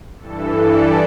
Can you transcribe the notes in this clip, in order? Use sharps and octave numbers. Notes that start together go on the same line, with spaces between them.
G2 E3 A4
D5